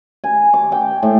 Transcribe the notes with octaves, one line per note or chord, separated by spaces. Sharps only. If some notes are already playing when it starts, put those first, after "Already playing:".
G#5
D6
G5
A2